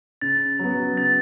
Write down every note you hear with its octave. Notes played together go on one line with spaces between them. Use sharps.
C#3 A6
F#3 B3
C#3 A6